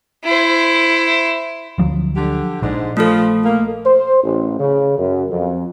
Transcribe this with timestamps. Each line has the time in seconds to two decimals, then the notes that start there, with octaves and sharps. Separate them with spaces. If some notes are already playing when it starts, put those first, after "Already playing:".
0.24 E4 C5
1.78 D2 F3 F#3
2.16 D3 G4
2.62 A#1 G#2 D4
2.97 F3 A3 A4
3.45 A#3
3.86 C5
4.22 A1
4.59 C#3
4.97 F#2
5.30 F2